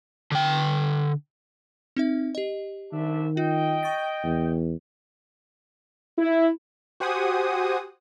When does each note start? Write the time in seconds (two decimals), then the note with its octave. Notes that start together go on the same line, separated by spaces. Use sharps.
0.32 D3 G5
1.97 C4 D#4 E5
2.35 G4 D#5
2.93 C2 D#3 D4 E5
3.37 F4 D#5 G5
3.83 C#6 A6 A#6
4.24 E2
6.19 E4
7.00 F#4 G4 C5 F#5 G#5 D#6